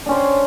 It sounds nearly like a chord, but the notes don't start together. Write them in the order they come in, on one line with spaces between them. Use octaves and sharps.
D4 C#4 C5